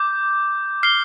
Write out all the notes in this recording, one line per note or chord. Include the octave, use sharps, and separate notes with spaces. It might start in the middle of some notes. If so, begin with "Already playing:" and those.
Already playing: D6 G6
F6 C7 G7